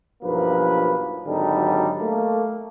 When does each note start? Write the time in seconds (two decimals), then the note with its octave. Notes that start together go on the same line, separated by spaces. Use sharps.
0.23 B1 G2 F3 A#3 B4
1.27 G#1 D3 F#3 G3 D#4 A4
2.01 A3 A#3